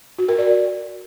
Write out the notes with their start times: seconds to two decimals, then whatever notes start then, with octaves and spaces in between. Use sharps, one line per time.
0.18 F#4
0.28 A#4
0.38 D5